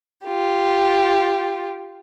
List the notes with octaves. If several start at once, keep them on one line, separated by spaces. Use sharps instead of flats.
F4 G4